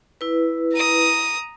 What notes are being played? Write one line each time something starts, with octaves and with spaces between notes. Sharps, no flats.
E4 B4
A#5 D#6